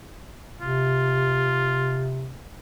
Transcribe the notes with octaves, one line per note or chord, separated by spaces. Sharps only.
C3 F4